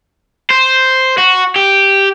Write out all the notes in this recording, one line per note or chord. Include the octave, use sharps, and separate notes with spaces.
C5
F#4
G4